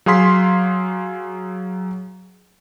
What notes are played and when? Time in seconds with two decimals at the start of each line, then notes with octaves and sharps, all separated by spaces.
0.06 F#3 G#4 F5 C6 B6